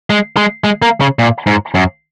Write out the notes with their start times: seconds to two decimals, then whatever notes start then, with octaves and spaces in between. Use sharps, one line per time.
0.10 G#3
0.37 G#3
0.64 G#3
0.82 A#3
1.01 C#3
1.19 A#2
1.47 G#2
1.75 F#2